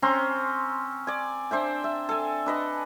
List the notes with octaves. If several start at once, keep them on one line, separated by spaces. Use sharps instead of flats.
C4 C#4 A#5 C6
D5 G#5
D4 C5 E5 G5
E5
A4 G#5
D4 B4 D#5